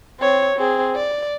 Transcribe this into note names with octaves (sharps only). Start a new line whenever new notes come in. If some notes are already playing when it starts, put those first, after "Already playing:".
C4 C#5
C4 G#4
D5